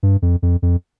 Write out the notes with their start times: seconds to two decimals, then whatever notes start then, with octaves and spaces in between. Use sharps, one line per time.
0.03 G2
0.22 F2
0.42 F2
0.62 F2